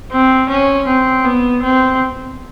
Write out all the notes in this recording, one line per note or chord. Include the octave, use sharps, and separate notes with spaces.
C4
C#4
C4
B3
C4